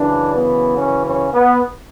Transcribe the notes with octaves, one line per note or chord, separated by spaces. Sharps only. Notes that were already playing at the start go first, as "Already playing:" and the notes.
Already playing: F#2 C#3 E3 D4
B3
C#4
C#4
B3